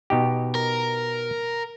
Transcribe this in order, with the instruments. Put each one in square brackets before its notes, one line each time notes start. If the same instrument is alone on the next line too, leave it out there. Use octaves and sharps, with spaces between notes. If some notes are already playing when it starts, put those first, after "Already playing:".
[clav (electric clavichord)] B2 D#4 G4
[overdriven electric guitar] A#4